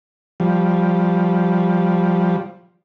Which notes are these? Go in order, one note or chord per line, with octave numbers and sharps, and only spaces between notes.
F3 G3